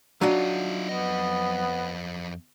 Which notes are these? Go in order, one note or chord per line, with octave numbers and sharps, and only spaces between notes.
F#3 D4 D#4 F4 F#5
F2 B3 D#5